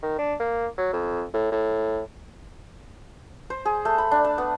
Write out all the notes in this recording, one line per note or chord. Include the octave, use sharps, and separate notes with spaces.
D#3
D4
A#3
F#3
F2
A2
A2
C5
G#4
A3
B5
D4
A5
B3